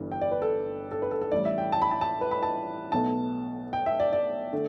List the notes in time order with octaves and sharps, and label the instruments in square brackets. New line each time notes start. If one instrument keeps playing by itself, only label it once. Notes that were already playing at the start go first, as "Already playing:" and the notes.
Already playing: [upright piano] G1 G2 E3 G3
G5
D5
B4
A4
A4
B4
A4
A4
A1 A2 G3 D5
E5
G5
A5
B5
A5
A5
B4
B5
A5
B1 B2 A3 A5
G5
E5
D5
D5
D3 A3